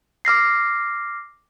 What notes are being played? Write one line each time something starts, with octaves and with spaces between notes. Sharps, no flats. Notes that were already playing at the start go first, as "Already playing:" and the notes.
D6 F6 A#6 C7